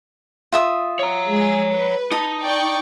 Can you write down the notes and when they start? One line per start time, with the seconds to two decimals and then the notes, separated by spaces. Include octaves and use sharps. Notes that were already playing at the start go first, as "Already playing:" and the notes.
0.52 F4 E5 D#6
0.99 C#5 A#5
1.30 G#3 G#4
1.72 B4
2.12 D#4 D#5 A5
2.43 D5 G5 C#6